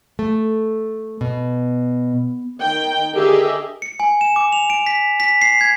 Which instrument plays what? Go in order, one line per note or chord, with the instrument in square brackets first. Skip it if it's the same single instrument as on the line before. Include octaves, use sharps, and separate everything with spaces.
[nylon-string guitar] A3
B2
[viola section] D#3 G5
D3 G4 G#4 A#4 D#5 E5
[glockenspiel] C#7
G#5
E7
D6
F7
D7
B6
B6
C7
G#6